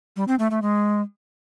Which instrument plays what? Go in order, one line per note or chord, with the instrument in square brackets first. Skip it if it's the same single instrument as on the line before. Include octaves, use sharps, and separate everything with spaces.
[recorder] G3
C4
A3
A3
G#3